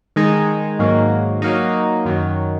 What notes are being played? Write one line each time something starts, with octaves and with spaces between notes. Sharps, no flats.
D#3 G#3 D#4 G#4
G#2 D#3 F#3 A#3
F#3 A#3 D#4
F#2 D#3 F#3